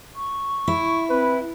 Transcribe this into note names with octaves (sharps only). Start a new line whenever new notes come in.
C#6
E4
C4 B4